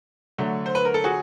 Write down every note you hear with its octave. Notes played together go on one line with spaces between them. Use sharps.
D3 F#3 A3
C5
B4
A#4
A4
F#4 G#4